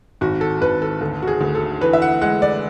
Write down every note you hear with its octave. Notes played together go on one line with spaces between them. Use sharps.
G#1 F#4
A4
G#1 B4
A4
D2 A4
F#4
G#4
D2
A4
E3 B4
E5
F#5
G#3 F#5
D5